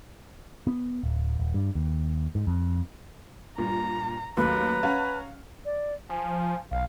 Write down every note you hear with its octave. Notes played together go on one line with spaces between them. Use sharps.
B3
D1
D#1
G2
D#2
G#2
F2
G2 A#2 A#5
D#2 F#3 A3 C#4 B4 A#5
C#4 F5 F#5 F6
D5
F3 G#5
B1 F5